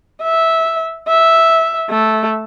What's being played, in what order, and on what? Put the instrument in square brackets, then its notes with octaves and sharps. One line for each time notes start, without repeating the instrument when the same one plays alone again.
[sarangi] E5
E5
A3